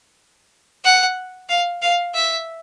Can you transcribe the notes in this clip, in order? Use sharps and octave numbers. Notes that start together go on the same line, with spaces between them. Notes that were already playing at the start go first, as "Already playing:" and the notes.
F#5
F5
F5
E5